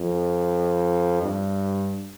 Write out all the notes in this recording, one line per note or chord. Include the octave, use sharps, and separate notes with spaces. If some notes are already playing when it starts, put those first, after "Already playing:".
Already playing: F2
G2